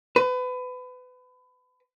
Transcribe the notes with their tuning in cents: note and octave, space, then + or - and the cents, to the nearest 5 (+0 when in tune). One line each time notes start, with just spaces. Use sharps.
B4 +30